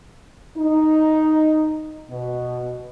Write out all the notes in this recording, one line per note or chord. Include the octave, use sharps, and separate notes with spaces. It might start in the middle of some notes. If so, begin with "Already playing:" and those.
D#4
B2